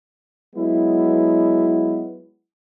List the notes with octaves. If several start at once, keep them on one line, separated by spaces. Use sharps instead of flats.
F#3 G#3 B3 E4